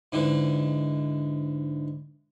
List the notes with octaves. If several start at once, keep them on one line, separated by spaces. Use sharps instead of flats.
G#2 D3 E3